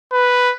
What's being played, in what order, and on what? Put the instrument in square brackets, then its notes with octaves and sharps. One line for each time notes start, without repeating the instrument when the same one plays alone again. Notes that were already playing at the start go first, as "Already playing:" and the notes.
[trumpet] B4